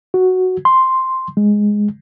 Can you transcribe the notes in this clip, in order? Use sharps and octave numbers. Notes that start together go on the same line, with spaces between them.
F#4
C6
G#3